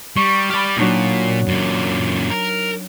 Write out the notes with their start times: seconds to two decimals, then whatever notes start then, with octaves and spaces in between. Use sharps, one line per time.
0.17 G3 C#6
0.50 G4 D5 B5 F6
0.77 A#2 F#3 D4 D#4
1.48 F#2 A#2
2.30 A#4